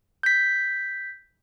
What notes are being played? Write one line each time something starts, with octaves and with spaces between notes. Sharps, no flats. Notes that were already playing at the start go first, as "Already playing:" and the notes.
G6 B6